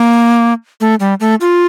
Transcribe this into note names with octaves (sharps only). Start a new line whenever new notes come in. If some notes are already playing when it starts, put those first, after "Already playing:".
Already playing: A#3
A3
G3
A3
F4